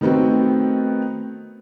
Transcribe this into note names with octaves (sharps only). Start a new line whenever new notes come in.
D#3 A3 B3 C4 F#4